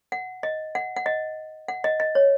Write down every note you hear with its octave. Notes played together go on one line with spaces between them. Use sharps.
F#5
D#5
F#5
F#5
D#5
F#5
D#5
D#5
C#5